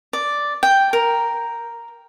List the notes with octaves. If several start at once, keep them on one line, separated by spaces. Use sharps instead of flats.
D5
G5
A#4